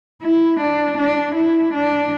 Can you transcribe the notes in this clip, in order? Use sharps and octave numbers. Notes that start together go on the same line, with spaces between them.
E4
D4
D4
E4
D4